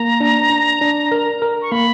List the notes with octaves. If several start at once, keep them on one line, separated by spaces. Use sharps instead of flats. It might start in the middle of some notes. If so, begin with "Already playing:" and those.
Already playing: A#3 A#5
D4
D4
D4
A#4
A#4
C#6
A#3 B5